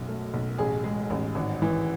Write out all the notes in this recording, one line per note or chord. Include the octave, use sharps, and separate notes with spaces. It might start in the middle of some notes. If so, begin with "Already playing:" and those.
Already playing: B1 F#2
A3
B1
A1 G#4
G#3
A1
G#1
E3